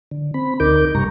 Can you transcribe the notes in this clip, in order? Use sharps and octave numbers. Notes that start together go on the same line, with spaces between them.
D3
C4 B5
D2 D3 D#4 A#4 D6 G6
G2 C3 G3 A#5 C#6